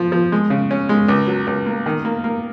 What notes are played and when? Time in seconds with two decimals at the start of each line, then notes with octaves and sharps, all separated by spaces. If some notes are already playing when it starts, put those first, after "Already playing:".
Already playing: F3
0.12 F3
0.32 G#3
0.50 C#3
0.71 C#4
0.89 G#3
1.08 C#2
1.27 F#3
1.47 C#2
1.66 A#3
1.86 D#3
2.05 A#3
2.24 A#3